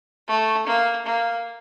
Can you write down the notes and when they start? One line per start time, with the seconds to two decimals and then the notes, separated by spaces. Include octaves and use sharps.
0.28 A3
0.67 A#3
1.06 A#3